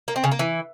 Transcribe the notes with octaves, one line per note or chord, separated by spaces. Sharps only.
A#3
C4
C#3
A#3
E3